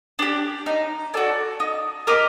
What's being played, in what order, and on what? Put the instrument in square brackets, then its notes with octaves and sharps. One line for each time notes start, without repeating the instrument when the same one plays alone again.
[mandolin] D4 G4
D#4
F#4 A4 D5
D#4
G4 A#4 D#5